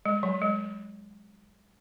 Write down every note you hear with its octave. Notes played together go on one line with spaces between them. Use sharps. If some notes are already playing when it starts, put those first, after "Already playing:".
G#3
F#3
G#3